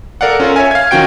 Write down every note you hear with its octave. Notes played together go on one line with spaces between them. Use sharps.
A4 A#4 D5 F5 F#5
C#4 F4 A4 A#4
C#5 E5 G#5
F5 G#6
D#3 F3 C#4 F#4 G5 D7